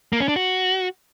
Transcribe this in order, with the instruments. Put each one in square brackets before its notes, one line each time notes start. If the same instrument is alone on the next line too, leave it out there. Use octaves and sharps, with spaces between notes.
[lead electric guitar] A#3
C#4
D4
F#4